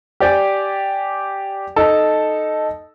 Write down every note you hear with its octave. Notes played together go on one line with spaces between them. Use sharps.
G4 D5 G5 G#5
D#4 A4 A5